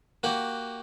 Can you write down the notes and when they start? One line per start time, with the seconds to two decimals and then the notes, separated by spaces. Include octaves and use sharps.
0.23 A#3 F#4 G4 F#5